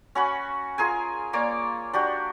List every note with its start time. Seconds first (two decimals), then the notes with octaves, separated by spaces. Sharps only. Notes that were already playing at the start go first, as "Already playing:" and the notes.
0.15 C#4 F#4 B5
0.78 F4 G#4 A#4 G#5
1.33 A#3 C#5 D5
1.93 D4 F#4 G4